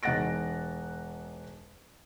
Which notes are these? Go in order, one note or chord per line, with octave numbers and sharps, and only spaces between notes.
E1 D#4 F#5 A6 A#6 D7